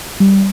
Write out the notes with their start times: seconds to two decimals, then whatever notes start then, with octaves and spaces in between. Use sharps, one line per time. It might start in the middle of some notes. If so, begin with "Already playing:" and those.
0.20 G3